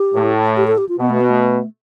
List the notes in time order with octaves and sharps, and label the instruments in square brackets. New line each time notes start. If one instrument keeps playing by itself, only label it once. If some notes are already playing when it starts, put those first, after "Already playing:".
Already playing: [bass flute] G4
[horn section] A2
[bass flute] G4
A4
G4
F4
[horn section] B2 [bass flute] B3
[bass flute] A3
B3
A3